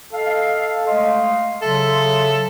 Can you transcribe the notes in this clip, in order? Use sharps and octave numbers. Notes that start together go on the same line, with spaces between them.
A4 D#5 F5
G#3 A3 D#5 F5 C6
C#3 F#3 A4 E5